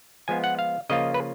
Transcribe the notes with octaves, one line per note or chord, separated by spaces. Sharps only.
F3 G#3 B3 F4 G#5
F#5
F5
C#3 F3 A#3 F4 D#5
B4